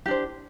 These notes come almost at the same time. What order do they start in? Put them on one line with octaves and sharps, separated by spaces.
G4 D4 C5